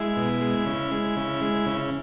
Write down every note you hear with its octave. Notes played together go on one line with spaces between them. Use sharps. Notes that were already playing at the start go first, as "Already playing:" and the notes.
Already playing: G#3 E4
B2
G#3
C#3
G#3
C#3
G#3
C#3